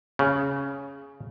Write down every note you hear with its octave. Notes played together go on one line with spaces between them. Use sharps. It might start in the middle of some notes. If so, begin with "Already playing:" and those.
C#3